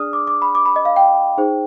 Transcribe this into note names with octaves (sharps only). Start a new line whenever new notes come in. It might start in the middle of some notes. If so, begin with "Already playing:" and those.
Already playing: D4 G#4 D5 D#6 F6
D6
D6
B5
D6
B5
D#5
F5
G5
D#4 G#4 C5